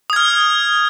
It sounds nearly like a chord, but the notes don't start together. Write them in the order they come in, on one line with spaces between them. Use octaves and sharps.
D#6 G#6 F6